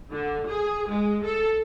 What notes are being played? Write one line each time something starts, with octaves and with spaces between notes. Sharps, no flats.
D3
G#4
G#3
A4